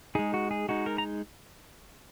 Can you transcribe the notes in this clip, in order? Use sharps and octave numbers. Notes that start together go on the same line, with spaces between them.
G#3 D#4 G#4
F#4
G#4
G#3 D#4 F#4
A#4
A#5